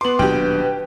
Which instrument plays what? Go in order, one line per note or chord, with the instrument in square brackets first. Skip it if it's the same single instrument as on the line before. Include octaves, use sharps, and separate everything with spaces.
[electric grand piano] B3 C6 [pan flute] B4 [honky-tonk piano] D6 F#7
[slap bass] D#1 F#3 D4 [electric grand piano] B2 [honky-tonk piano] G4 G5